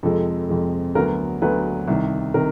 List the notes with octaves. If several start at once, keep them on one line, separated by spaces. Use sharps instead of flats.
F2 C3 F3 G#3 A4
F2 C3 F3 G#3
D2 D3 F#3 B3 A#4
D2 D3 F#3 B3 B4
C2 C3 D#3
C3 D#3 A#4